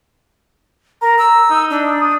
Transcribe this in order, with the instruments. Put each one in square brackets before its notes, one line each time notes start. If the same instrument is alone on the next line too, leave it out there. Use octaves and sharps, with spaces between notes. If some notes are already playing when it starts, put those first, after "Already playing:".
[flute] A#4 [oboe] A#5
[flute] E6
[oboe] D#4
[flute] D4
[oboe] D#6